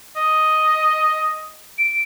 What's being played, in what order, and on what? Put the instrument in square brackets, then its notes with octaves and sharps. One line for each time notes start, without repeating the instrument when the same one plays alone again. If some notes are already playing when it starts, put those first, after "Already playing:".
[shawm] D#5
[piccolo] D7